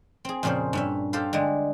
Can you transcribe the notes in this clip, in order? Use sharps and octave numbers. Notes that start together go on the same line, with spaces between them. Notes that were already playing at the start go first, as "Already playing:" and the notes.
C4 G#4
F2 A#2 C#3 G#4 C5
G2 C#4 E5
G4 A4 C5 F5
D3 G3 G#3